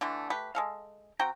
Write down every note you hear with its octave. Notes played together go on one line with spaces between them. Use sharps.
D3 E3 A3 D4
A3 G4 B4
G#3 A4 F5
C4 F#4 G5 A#5